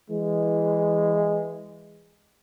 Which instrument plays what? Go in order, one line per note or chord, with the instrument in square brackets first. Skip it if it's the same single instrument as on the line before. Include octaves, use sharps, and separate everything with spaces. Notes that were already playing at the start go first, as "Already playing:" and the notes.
[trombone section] E3 G#3